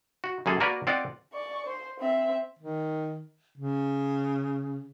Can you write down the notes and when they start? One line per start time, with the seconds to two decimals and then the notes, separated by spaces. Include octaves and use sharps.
0.24 F#4
0.46 F#2 A#3 G#4 A4
0.60 A#3 F#4 A#4 B4 D5
0.87 C4 F4 D5 D#5 F#5
1.33 D5 C#6
1.66 C5
2.00 C4 E5
2.59 D#3
3.57 C#3